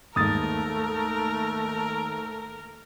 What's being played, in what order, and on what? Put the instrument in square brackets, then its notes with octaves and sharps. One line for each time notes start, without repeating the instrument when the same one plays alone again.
[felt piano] D#2 G#2 [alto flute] A3 [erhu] A#4 [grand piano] D#6 A6